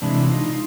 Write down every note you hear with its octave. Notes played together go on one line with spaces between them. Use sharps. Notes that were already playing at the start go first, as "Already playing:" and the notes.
C3 E3 G#3 D4 E4
D#4 F4